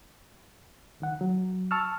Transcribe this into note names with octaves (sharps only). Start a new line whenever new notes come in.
C#2 D#3 F#5
F#3
A5 C#6 E6 F6